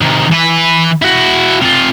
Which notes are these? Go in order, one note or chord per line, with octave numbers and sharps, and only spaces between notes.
C3 D#3
E3 B4
E4 F#4
C3 F4